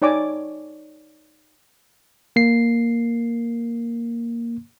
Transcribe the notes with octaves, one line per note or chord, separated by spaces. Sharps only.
D#4 C#5 D5 G#5 D6
A#3 C7